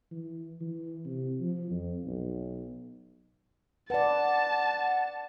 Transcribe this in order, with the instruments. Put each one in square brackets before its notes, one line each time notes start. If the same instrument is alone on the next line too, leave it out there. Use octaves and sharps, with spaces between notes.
[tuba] E3
E3
C3
F3
F2
B1
[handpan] B4 D5 [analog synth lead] F#5 [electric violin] A5